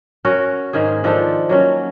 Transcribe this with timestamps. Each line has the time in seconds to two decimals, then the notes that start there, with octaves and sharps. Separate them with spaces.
0.25 C#4 F#4 A#4
0.73 G#2 D#3 A#3 G#4
1.04 D#3 F3 D4 A4
1.49 F#3 A#3 C#4